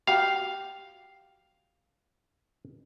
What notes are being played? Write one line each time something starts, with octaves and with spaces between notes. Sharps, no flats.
F#4 G4 F5